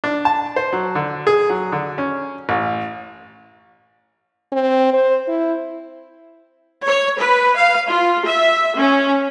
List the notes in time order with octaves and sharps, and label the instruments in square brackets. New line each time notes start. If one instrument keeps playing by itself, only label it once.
[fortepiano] D4
A5
C5
F#3
D3
G#4
F#3
D3
C#4
A1
[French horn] C4
C5
E4
[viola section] C#5
B4
F5
F4
E5
C#4